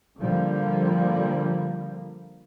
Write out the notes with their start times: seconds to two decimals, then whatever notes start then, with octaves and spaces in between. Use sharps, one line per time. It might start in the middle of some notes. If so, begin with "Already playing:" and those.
0.18 D3 F3 G3 A#3